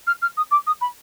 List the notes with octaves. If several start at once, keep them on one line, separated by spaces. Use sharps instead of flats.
F6
F6
D#6
D6
D#6
B5